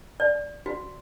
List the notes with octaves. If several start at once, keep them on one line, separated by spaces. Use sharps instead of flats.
D5
F#4